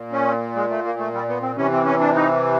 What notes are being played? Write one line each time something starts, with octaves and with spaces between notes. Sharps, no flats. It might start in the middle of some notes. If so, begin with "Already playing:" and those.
Already playing: A#2
C#4
G#3
A3
A#3
A3
G3
B3
C4
C3 E3 C#4
C4
C#4
D4
D#4